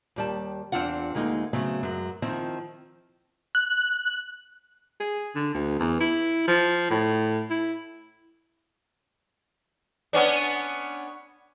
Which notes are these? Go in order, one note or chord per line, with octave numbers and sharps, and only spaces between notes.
D#2 G3 A5
E2 C4 D4 F4 F#5
D2 G#3 A#3 D#4
C#3 F#3 A3 B3 C4
F#2 F#3 G#3
D#3 F3 C4 E4
F#6
G#4
D3
D2
E2
E4
F3
A2
E4
B3 C#4 D4